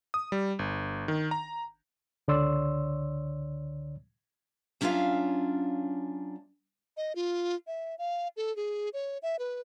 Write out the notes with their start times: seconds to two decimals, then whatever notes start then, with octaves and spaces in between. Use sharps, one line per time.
0.14 D#6
0.32 G3
0.59 G1
1.08 D#3
1.31 A#5
2.28 C#2 D3 C#5 D5 C6 E6
4.81 F#3 C#4 D4 F4 E5 F5
6.97 D#5
7.15 F4
7.67 E5
7.99 F5
8.37 A4
8.56 G#4
8.93 C#5
9.22 E5
9.39 B4